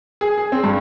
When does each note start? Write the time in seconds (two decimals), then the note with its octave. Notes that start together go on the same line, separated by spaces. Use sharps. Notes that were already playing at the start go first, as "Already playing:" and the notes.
0.21 G#4
0.38 G#4
0.52 C4
0.64 G2